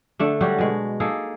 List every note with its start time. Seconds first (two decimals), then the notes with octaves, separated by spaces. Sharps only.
0.19 D3 A3 D4
0.41 F#3 G3 F#4 G4
0.59 B2 G#3
1.00 A#3 D#4 G#4 A4